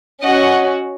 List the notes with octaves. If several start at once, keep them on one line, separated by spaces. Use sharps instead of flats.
C#4 F#4 D#5 F#5